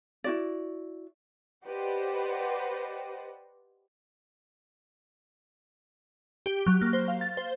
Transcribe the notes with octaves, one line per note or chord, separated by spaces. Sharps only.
E4 F#4 D5
G4 B4 C5 D5 D#5 F#5
G4
F#3
A#3
C5
F5
A6
C5